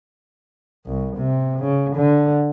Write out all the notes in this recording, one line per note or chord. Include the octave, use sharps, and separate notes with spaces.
C2
C3
C#3
D3